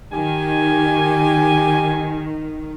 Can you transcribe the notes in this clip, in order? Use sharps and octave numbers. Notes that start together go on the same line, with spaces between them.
D#3 G4 G#5